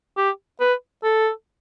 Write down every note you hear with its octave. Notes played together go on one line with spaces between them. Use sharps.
G4
B4
A4